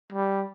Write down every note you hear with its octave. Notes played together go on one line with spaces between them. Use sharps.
G3